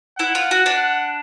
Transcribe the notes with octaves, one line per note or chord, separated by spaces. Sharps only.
E4 F#5
F4
F#4
D4